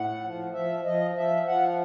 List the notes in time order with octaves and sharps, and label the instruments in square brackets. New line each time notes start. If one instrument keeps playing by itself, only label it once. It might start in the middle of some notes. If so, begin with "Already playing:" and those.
Already playing: [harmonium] A2 F#5
F3
F3 E5
F3 D#5
F3 E5
F3 F#5